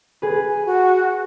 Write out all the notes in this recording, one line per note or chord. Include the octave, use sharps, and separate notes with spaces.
G#4 B4
G#5
F#4